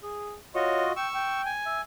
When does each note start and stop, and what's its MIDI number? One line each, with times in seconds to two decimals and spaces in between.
0.03 0.36 68
0.55 0.92 65
0.55 0.92 66
0.55 0.84 73
0.55 0.92 75
0.96 1.07 79
0.96 1.42 85
0.96 1.42 88
1.14 1.51 79
1.46 1.81 80
1.66 1.80 76